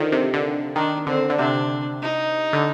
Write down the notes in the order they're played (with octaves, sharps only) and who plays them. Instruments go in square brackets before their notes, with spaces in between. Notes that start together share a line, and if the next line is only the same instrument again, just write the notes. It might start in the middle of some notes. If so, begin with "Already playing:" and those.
Already playing: [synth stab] D3 D#3 F3
C3
D3
[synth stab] D#3 [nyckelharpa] D4
[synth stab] D3 [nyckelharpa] C4
[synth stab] D3
[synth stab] C3 [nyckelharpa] D4
[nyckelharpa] D#4
[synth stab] D3